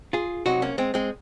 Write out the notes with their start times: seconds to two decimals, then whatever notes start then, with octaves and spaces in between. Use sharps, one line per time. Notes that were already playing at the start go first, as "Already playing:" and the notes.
0.13 F4 G#4
0.46 C#2 C3 F#3 D#4 F#4
0.62 A#3 C#4
0.78 G#3 C4
0.94 G#3 C4